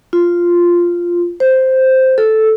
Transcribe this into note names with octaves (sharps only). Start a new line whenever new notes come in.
F4
C5
A4